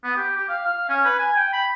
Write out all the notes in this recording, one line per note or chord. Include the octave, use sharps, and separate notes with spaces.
B3
G4
G4
F5
F5
C#4
B4
G#5
G5
B5